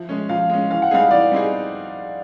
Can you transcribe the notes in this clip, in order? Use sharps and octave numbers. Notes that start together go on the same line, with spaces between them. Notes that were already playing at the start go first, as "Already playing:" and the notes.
Already playing: F3 E5
G#3 C#4
F3 F5
G#3 C#4
E3 F5
F#5
G3 C4 D#4 G#4 F5
E3 D5
G3 C4 D#4 G#4